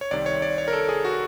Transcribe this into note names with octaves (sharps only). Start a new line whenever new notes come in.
C#5
C2 C3 D#3 D5
C#5
D5
C#5
A#4
A4
G#4
F#4